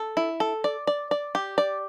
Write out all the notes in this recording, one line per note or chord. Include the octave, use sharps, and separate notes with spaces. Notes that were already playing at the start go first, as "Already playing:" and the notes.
Already playing: A4
E4
A4
D5
D5
D5
G4
D5